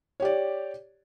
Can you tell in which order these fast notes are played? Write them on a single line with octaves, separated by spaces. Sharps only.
C#5 G4 D5